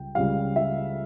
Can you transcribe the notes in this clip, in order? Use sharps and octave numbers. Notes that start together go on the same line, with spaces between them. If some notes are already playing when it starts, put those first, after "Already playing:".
Already playing: C#2 C#3 G3 G5
C#2 C#3 G3 F5
E5